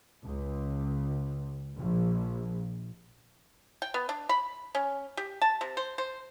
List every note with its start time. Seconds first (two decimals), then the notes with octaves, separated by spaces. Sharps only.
0.24 C#2
1.75 A#1
3.82 G5
3.94 B3
4.09 D4
4.29 B5
4.75 C#4
5.17 G4
5.42 A5
5.61 C3
5.77 C5
5.98 C5